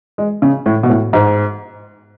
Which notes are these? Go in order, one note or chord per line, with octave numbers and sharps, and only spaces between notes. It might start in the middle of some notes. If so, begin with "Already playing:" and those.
G#3
C#3
A2
B2
A2
G#2